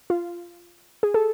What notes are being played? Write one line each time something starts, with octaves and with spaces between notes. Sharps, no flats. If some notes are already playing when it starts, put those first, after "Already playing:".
F4
G#4
A4